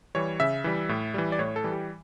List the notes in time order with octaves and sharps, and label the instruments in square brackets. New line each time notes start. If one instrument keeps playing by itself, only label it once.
[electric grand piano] E3 G3 C#5
C#3 E5
E3 G3
A2
E3 G3
D5
A2 C#5
A4
E3 G3
G4